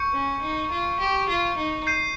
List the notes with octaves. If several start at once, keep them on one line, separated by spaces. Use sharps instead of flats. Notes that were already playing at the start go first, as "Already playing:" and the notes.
Already playing: C#6 G6 C#7
C#4
D#4
F4
G4
F4
D#4
G6 C7 D#7